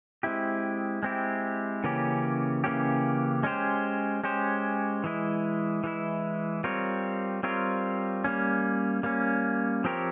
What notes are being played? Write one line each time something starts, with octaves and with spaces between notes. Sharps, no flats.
G#3 C4 E4 G4
G#3 C4 E4 G4
C#3 E3 A#3 C#4 G4
C#3 E3 A#3 C#4 G4
G#3 C#4 G4 C5
G#3 C#4 G4 C5
E3 G#3 E4
E3 G#3 E4
G3 C4 F4 A#4 C#5
G3 C4 F4 A#4 C#5
G3 A#3 C#4
G3 A#3 C#4
F3 C4 G4 A#4 C#5